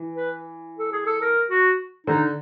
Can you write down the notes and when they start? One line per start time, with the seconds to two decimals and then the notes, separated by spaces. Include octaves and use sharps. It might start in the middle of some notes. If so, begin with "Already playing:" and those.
Already playing: E3
0.15 B4
0.79 A4
0.92 G#4
1.06 A4
1.22 A#4
1.50 F#4
2.07 D3 D#4